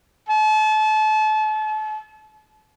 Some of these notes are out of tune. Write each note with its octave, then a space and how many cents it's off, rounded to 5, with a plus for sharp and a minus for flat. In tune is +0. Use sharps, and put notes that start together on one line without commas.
A5 -35